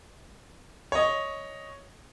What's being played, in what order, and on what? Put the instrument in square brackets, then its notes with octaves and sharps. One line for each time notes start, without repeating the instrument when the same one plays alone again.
[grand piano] C#5 D#5